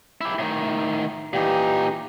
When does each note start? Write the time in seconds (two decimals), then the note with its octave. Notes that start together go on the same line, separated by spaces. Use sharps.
0.21 E4 G4
0.39 A2 D#3
1.33 A#2 E3 D#4 G4